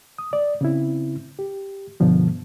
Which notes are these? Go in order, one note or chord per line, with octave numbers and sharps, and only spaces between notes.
D#6
D5
C#3 C4 E4
G4
G2 B2 D3 F3 B3